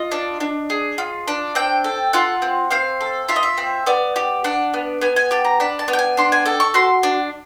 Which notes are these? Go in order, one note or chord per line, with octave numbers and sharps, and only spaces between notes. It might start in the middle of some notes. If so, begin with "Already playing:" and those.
Already playing: F4 D#5
D4
D4
G#4
F4
D4
C4 G5
A4
F4 F#5
C4
C4 F5
A4
F4 E5
D#5
E5
C4
B3 D5
G4
D4 F#5
B3
B3 G#5
G#5
G4 A5
A#5
D4 B5
A5
B3
G5
G#5
D4 C6
G#5
A4 G5
C#6
F#4 C6
D4